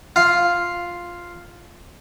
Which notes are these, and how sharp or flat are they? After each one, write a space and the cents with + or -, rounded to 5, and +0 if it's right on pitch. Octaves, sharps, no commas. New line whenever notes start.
F4 +0 F5 +0